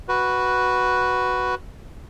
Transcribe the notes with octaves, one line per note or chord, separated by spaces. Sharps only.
F#4 B4